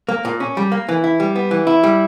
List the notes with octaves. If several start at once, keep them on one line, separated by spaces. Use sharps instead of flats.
A#3
A#2
C#4
G3
A#3
E3
E4
G3
B3
E3
E4
G3